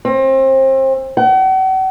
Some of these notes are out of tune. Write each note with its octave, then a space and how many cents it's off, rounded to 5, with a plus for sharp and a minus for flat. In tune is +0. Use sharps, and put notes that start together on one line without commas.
C4 +30
F#5 +40